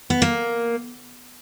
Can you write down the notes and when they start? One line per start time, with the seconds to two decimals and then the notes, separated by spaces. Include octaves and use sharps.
0.10 B3
0.22 A#3